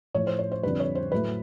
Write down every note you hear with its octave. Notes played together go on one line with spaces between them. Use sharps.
A2 F3 A3 C#5
C5
C#5
C5
F2 D3 G3 B4
C#5
C5
A2 F#3 A3 B4